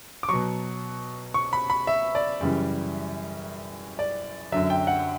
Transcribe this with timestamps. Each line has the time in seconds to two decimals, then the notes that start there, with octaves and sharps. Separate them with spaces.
0.23 D6
0.29 B2 F#3 C#6
1.34 C#6
1.53 B5
1.70 B5
1.87 E5
2.15 D5
2.41 F#2 C#3 E3 G3
3.99 D5
4.52 F#2 D3 F#3 E5
4.70 G5
4.87 F#5